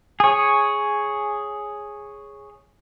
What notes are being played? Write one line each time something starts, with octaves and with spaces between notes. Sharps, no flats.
G#4 C#5